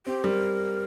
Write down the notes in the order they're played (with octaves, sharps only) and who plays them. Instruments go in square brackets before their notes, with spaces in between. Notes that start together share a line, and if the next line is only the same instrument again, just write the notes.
[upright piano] C4 [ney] G4
[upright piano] G3 [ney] A#4